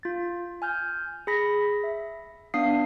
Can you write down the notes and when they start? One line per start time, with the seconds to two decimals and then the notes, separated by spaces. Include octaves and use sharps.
0.03 F4 A6
0.62 G#5 F6 G6
1.27 G#4 B5 A#6 B6
1.84 E5
2.54 B3 D4 F5 D#6 C7